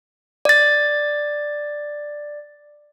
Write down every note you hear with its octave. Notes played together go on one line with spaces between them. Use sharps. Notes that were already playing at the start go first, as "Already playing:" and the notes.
D5 A6